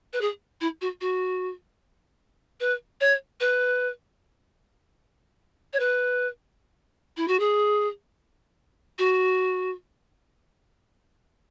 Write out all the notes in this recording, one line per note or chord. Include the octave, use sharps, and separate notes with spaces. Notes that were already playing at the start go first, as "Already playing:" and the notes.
B4
G#4
E4
F#4
F#4
B4
C#5
B4
C#5
B4
E4
F#4
G#4
F#4